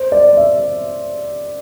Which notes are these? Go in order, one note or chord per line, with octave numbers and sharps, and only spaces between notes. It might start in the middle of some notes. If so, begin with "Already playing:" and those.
Already playing: C5
D5
E5